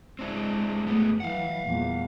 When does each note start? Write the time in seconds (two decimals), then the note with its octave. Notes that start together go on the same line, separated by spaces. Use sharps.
0.19 G#3 C4 D4 E4
0.86 F#2 G#3 A3 B3
1.20 E3 F#3 F5 F#5
1.64 E2 A#2 G3